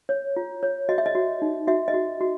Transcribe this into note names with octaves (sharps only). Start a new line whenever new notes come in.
C#5
F4
C#5
F#4 D#5
E5
D#5
F#4
D#4
F#4 E5
D#5
F#4
F#4